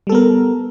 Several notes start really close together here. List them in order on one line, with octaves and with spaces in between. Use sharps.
G3 A4 B3 A#4